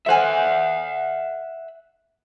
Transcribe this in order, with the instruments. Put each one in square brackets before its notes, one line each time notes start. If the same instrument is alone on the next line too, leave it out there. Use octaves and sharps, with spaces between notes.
[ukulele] A4 C5 G#5 [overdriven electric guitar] E5 F#5